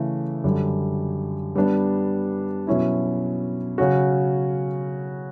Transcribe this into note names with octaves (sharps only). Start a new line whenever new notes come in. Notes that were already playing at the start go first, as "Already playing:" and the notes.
Already playing: C#3 E3 A3
F#2 D3 G3
G3 B3 D4
B2 F#3 C#4 E4
C#3 F#3 C#4 F#4